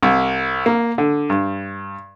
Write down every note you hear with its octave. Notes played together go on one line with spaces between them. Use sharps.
C2
A#3
D3
G2